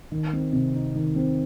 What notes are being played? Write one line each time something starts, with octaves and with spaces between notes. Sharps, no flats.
D#3
C4
C3
D#4
D#3
C4